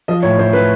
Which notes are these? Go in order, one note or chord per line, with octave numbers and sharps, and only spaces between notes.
F3 D#5
A2 C#5
A2 C5
A2 B4